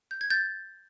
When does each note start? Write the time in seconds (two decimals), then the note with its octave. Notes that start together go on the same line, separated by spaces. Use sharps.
0.11 G6
0.21 G#6
0.30 G6 A6